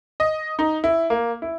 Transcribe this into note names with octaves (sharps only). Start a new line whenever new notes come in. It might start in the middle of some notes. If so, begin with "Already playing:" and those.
D#5
D#4
E4
A#3
E4